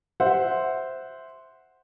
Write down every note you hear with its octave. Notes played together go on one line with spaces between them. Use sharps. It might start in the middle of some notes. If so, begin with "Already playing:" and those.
C5 E5 F#5